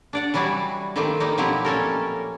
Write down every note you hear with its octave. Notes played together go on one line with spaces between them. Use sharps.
D4 D5 F#5
E3 F#3 G3 E4 F#4
D#3 F3 G3 A3 A#3 C4
G3 A#3 D#4
B2 F3 F#3 C4 E4 G4
A#2 C#4 A4 A#4